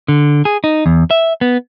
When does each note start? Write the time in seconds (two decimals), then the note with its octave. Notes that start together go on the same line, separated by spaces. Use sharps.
0.08 D3
0.45 G#4
0.64 D#4
0.86 E2
1.11 E5
1.41 B3